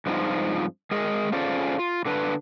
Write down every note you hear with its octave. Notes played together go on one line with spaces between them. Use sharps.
G2 F3 G#3 C4 D#4 F4
G#3 G#4 A#4 D#5
C#4 F4 G#4 A4 C5 D5
F4
D3 D4 B4